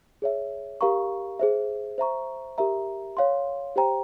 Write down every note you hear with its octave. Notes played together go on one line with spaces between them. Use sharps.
G#4 C#5 E5
G4 A#4 F5 A#5 C#6
G#4 C5 E5
C5 E5 A#5 C#6
G4 A#4 E5 A#5
C#5 F5 C6
G4 C5 G5 A#5